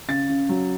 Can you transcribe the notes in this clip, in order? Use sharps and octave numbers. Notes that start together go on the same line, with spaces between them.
C#3 A6
C#3
F#3